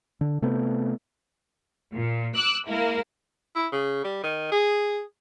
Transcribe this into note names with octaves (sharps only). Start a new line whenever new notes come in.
D3
C3 A3 B3
A#2
D6 E6 F#6
G#3 A#3 E4 A#4
E4
C#3
G3
D#3
G#4